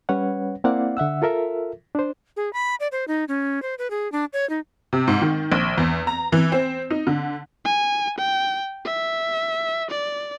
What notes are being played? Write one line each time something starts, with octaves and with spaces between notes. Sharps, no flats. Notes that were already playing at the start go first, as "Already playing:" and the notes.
G3 C#4 B4 C#5 F#5
A#3 C4 E4 D5 F5 F#5
D3 E5 F#5 E6
F4 A4 A#4 E5
D4 C5
G#4
B5
D5
C5
D#4
C#4
C5
B4
G#4
D4
C#5
D#4
C3
G#2
D#3
A#1
E2
A#5
E3
C4
D#4
D3
G#5
G5
E5
D5